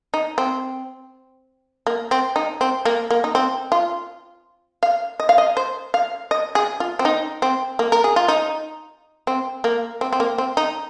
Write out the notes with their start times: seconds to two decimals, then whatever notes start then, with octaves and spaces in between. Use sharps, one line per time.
0.14 D#4
0.38 C4
1.87 A#3
2.11 C4
2.36 D#4
2.61 C4
2.85 A#3
3.10 A#3
3.24 D#4
3.35 C4
3.72 F4
4.83 F5
5.20 D#5
5.29 F5
5.38 D#5
5.57 C5
5.94 F5
6.31 D#5
6.55 G#4
6.80 F4
6.99 C4
7.05 D#4
7.42 C4
7.79 A#3
7.92 A#4
8.04 G#4
8.16 F4
8.28 D#4
9.27 C4
9.64 A#3
10.01 C4
10.13 C4
10.20 A#3
10.38 C4
10.57 D#4